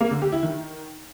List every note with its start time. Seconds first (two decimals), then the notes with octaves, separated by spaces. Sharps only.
0.01 A#3
0.11 D3
0.22 G4
0.32 E4
0.43 D#3